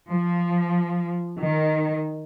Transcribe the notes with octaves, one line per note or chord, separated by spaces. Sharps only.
F3
D#3